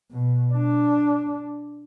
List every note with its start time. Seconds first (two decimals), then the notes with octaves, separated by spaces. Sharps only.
0.11 B2
0.53 D4